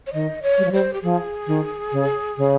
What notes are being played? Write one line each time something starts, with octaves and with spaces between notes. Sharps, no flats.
C#5
D#3 D#5
C#5
G3
F3
G3 C5
G4
F3 G#4
D#3
C#3
C#3